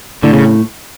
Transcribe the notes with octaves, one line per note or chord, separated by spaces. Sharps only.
A2 D3
C#3